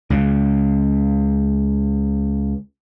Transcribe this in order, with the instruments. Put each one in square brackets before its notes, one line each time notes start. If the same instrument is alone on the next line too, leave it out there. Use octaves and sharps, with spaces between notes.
[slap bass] C#2 C#3